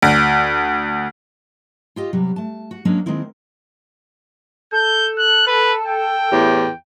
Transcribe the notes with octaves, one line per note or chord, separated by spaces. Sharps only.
D2
F4 G4 D#5 F5
C3 F#3 G3
A3 A5
F#4
F#3 G#3 A#3 C#4 D4
D#3 G#3 A#3 C4 E4
A4 G6
F#6
B4
G5
E2 A2 G4